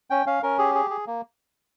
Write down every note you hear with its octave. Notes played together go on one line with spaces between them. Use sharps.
C#4 G5
C#4 F5
C#4 A#4
G4 G#4
G#4
G#4
A#3